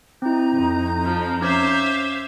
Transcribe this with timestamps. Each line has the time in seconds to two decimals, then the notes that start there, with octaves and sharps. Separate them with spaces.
0.22 C4 D#4 E4 A#5 G6
0.53 F2
1.03 F3
1.42 C#4 C5 E5 F5 D6 G#6